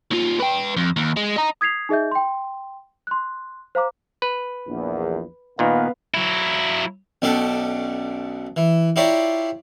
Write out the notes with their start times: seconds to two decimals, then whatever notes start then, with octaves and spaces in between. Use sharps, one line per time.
0.11 D#2 F4
0.40 B4 G5
0.77 F2
0.97 D#2
1.17 G#3
1.37 D#5 A#5
1.61 D#6 G#6 B6 C7 F7
1.89 D#4 G#4 D#5 E5 G6
2.11 G5 C6
3.07 C6 F#6
3.75 C5 F5 A#5 D6
4.22 B4
4.68 A#1 E2
5.59 A#2 D#3 B3 B4 F5
6.14 F#3 E4
7.22 B1 B2 C#4 D4 G4 A4
8.56 E3
8.96 E4 F4 G4 C#5 D5 A#5